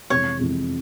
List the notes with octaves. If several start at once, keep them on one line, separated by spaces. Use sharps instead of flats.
F2 C3 E3 G#3 C#5
F2 C3 E3 G#3